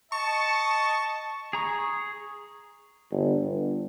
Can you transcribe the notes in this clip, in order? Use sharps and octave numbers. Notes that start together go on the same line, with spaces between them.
D#5 A5 C#6
G#4 A#5 C#6
G1
G1